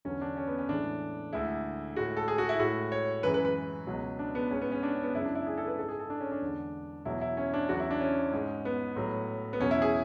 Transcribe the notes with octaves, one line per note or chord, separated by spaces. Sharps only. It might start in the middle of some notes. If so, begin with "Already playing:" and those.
E2 D3 F#3 C#4
D4
C#4
B3
C#4
A2 E3 G#3 D4
D2 D3 G#3 E4
A2 G#3 F#4
A4
G#4
F#4
E4
A2 G#3 F#4
C#5
F#2 E3 G#3 B4
B4
B4
C#2 B2 F#3
D4
B3
G#2 G#3 C#4
B3
C#4
D4
C#4
B3
F#2 C#3 G#3 E4
D4
E4
G#4
A4
B4
G#2 G#3 A4
G#4
A4
D4
C#4
D4
E2 D3 G#3
E2 B2 F#3 E4
E4
C#4
D4
E2 C#3 F#3 F#4
E4
D4
C#4
G#2 G#3
B3
A2 F#3
B3
E2 B2 F#3 C#4
E4
G#4